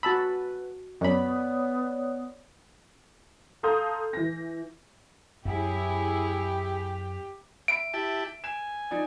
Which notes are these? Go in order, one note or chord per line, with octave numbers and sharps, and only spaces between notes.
F#4 B4 A5 B5 E6
F#2 B3 C#5 D5 B5
A4 F5 A#5 C6 D#6 G6
E3 A#6
F#2 E4 G4 G#4
E5 B5 D7
E4 G4 A5
G#5 E7
F3 D#4 D5